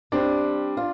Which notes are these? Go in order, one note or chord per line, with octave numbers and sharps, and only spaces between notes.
G3 C4 D4 G4
F4